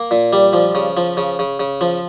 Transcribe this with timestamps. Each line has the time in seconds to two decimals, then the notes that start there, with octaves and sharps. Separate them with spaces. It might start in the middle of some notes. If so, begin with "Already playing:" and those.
Already playing: A#3
0.11 A#2
0.33 G3
0.53 F3
0.75 C#3
0.97 F3
1.17 C#3
1.39 C#3
1.60 C#3
1.81 F3